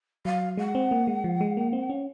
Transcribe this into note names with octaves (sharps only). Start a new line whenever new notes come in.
F#3 F5
G#3 F#5
C4
A#3
G#3
F3
G#3
A#3
C4
C#4